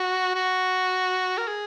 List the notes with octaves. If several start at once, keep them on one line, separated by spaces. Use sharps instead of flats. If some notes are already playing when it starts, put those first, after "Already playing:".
Already playing: F#4
F#4
A#4
G#4